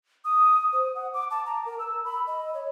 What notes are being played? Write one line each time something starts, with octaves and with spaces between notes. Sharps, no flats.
D#6
C5
F#5
D6
A5
A#5
A#4
E6
B5
D#5
C#5